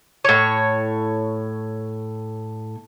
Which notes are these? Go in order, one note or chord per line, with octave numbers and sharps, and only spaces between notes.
A2 C#5